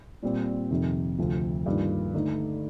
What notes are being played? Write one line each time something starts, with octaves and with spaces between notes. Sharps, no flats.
A#2 G3 C4
F2 C3 D#3
D2 C3 F3 C4
G2 D#3 A#3 F4
D3 A3 D#4 A4